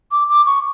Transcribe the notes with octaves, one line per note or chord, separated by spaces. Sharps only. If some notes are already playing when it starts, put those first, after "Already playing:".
D6
D6
C#6